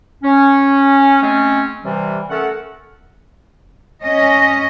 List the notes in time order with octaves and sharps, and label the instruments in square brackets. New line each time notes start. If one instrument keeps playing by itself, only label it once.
[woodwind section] C#4
G#3 A3 C4 C#4
C3 E3 G3
A3 C#4 A4 A#4 F#5
[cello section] C#4 D#5